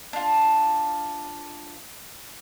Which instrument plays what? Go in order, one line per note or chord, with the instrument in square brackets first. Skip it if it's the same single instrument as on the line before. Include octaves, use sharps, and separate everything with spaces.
[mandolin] D4 F4